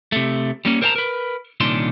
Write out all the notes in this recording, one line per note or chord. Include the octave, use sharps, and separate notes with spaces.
C3 A3
G3 A#3 C#4
A#4 C5 D5 G5 A5 A#5
A#4 B4
C2 A#2 D#3 C#4 D4 C6